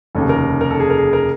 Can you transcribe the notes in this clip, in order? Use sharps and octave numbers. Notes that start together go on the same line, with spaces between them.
F1 D#2 C#3 A4
A#4
A#4
A4
G#4
A#4
G#4
A#4